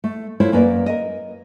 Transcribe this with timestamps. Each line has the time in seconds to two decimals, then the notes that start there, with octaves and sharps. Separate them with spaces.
0.04 A3
0.40 A3 E4 F4 C5 C#5
0.52 F#2 A#3 C#4 B4 D5
0.86 A#4 D#5